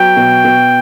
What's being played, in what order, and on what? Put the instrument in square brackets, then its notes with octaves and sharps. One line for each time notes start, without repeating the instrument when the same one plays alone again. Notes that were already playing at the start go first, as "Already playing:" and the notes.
Already playing: [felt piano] F#3 B3 [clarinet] G5
[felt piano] B2
B2